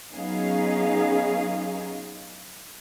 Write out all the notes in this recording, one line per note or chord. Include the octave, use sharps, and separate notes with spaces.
F#3 B3 C#4 D#4 G#4 F5